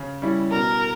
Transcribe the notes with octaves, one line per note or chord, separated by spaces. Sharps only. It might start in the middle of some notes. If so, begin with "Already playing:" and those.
Already playing: C#3
G3 C#4 E4
B2 A#4